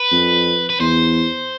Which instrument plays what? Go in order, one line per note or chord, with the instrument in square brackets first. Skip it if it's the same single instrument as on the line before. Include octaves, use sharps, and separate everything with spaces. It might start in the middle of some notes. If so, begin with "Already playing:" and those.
Already playing: [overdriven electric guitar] B4
[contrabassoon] F2
[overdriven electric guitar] B4
[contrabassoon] E2 [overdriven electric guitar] C5